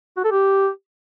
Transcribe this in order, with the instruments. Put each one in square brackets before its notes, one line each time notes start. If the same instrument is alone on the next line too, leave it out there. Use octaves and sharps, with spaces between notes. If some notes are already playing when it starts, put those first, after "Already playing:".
[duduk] F#4
A4
G4